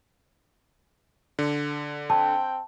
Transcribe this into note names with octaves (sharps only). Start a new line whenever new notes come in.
D3
C4 G5 A5